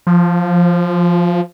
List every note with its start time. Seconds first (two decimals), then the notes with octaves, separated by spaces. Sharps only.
0.07 F3